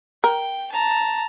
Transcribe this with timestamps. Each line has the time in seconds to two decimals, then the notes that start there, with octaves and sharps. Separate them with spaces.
0.24 A#4 G5
0.71 A5 A#5